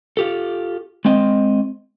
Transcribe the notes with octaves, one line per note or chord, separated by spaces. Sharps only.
F4 G4 A4
G#3 C4 D#5